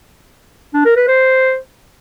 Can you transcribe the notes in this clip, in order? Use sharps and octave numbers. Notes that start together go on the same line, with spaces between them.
D4
A#4
B4
C5